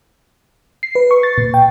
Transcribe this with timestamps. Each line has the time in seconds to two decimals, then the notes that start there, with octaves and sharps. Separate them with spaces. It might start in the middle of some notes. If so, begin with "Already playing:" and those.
0.83 C7
0.95 B4
1.11 C#6
1.23 A6
1.38 A#2
1.54 G5